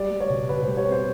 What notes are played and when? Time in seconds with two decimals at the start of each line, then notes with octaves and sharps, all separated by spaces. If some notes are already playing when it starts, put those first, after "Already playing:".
Already playing: G3 D5
0.11 G3
0.20 C#5
0.30 B2
0.49 B2 B4
0.63 G3 C5
0.77 C#5
0.87 C4 C5